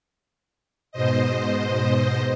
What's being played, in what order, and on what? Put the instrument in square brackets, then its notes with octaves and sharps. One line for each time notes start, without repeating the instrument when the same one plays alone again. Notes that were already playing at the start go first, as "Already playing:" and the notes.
[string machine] G#2 B2 C5 D#5